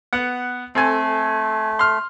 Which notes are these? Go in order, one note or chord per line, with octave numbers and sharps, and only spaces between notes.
B3 F#5
A3 C4 A4 G#5
C6 F6